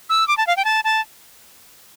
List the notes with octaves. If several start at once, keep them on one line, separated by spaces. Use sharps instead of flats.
E6
D6
A5
F5
G5
A5
A5